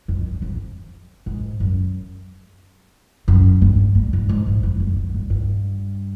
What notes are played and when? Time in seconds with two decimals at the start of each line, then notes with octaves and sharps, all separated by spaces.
0.08 F2
0.26 G2
0.42 F2
1.26 G#2
1.60 F#2
3.28 F#2
3.62 G2
3.95 G2
4.13 G2
4.29 G#2
4.47 G2
4.63 F2
4.80 F#2
4.96 G#2
5.14 G2
5.30 G2